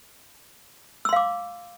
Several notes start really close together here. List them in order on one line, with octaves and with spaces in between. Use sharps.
E6 C6 F5 D6